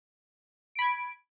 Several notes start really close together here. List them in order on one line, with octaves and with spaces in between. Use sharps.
D7 B5 G#6